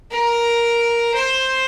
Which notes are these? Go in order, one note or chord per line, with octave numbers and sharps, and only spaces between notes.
A#4
C5